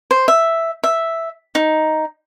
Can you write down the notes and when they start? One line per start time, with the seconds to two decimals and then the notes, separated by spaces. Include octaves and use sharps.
0.11 C5
0.28 E5
0.84 E5
1.55 D#4